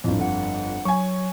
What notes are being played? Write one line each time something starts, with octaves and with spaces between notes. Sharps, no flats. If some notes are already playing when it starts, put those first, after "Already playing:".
G1 F2 A2
F#5
F#3 G#5 C#6